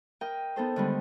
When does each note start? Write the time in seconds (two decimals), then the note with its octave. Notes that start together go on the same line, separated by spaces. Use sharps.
0.21 A#4 D#5 G5
0.56 B3 D#4 A4 C5
0.76 D3 D#3 G3 G#3 B3